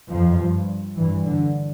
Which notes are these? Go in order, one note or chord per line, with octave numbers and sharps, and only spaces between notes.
F2 F3
G2
G2 E3
D3